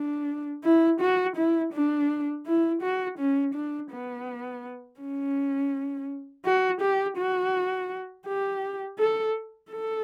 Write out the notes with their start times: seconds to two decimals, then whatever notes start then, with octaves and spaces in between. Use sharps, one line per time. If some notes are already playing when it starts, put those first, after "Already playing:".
Already playing: D4
0.64 E4
1.01 F#4
1.37 E4
1.73 D4
2.46 E4
2.82 F#4
3.19 C#4
3.54 D4
3.91 B3
5.00 C#4
6.45 F#4
6.81 G4
7.18 F#4
8.27 G4
8.99 A4
9.71 A4